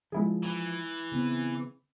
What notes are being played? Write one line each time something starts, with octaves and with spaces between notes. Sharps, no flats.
F3 G#3 E4 G#4
E3
C#3 B3 C4